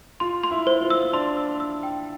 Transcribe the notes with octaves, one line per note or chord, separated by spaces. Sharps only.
F4 C6
C6
E4
C5
F4
E6
D4 C6
E6
E6
G5